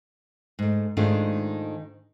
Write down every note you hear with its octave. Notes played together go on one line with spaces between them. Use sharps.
G#2 A3
G#2 D#3 G#3 A3 D4 F4